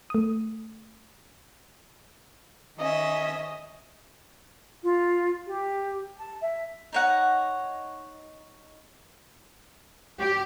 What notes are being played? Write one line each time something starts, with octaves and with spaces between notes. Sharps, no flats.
A3 D#6
D#3 C#4 D#5 E5
F4
G4
A5
E5
D#4 C#5 F#5
G4